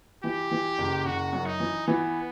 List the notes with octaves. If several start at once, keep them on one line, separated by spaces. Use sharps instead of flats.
E3 G4
E3
F#1
F#1 F#4
F#2
D#4
E3
E3 B3